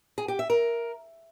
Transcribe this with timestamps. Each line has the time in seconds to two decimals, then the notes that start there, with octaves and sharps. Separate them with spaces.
0.18 G#4
0.28 G4
0.39 E5
0.50 A#4